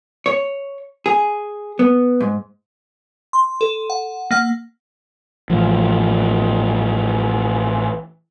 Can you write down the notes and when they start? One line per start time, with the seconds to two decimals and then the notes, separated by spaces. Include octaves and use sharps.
0.26 C#5
1.06 G#4
1.79 B3
2.21 G#2
3.33 C6
3.61 A4
3.90 F#5
4.31 A#3 F#5 F6
5.50 A1 F3